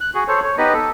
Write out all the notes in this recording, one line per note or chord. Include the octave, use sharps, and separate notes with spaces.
F#6
F#4 G#4
A4 C5 C#5
C#5
B3 D#4 G4 B4 D#5
A4